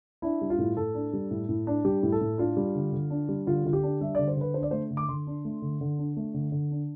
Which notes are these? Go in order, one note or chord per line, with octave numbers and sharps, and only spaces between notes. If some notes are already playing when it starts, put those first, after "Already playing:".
D4 E4
G3
F4
A2
A2 A4
D4
G3
A2
A2
D4
G3 G4
A2
A4
A2
D4 F4
G3
D3
D3
D4
G3
D3 F4
D3 F4
G4
D4
G3 E5
D3 D5
C5
D3 B4
D4 C5
D5
A3 C5
D3
D6
D3 C6
D4
A3
D3
D3
D4
A3
D3
D3
D4